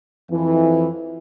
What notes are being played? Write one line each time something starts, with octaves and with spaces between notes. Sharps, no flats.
F2 E3